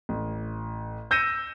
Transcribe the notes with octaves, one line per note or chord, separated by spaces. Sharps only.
A1
E6 G6 A#6 C#7 D#7 E7